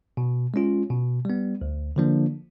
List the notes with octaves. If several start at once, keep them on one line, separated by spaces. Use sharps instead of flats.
B2
G#3 C#4 F4
B2
G3 B3
D2
D3 F3 A#3 D4